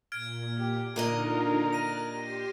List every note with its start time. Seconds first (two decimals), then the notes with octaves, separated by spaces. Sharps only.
0.12 A#2 F6 G#6 D7
0.58 G4
0.96 A#2 D3 D4 D#4 F4 A#4 D#5
1.73 F#6 A6 A#6 D#7
2.08 G4 C6